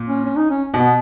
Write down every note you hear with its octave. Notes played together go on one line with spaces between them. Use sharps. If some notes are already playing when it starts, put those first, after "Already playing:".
Already playing: A#2
C#4
C#4
D#4
C#4
B2 B3